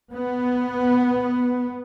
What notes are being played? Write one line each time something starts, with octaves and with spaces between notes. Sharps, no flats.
B3